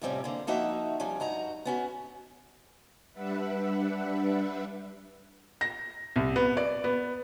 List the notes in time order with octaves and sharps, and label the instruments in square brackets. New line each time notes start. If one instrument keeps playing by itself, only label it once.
[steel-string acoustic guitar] F2 A2 C3 G3 C4 C#4
D3 A#3
F3 A#3 D#4 F#4 E5
F3 G3 C#4
G2 D#4 F#4 A#5
B3 C#4 F#4
[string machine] G3 D4 B4 E5 F#5
[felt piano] A#6
C2
B3
D5
B3